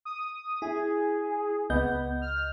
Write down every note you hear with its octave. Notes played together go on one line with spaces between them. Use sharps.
D#6
E4 G#4
C#2 B3 D#5 G6
F6